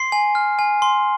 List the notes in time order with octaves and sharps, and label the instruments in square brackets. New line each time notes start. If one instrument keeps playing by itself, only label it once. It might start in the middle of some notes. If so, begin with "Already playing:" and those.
Already playing: [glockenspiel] C6 C7
G#5
F6
G#5
C6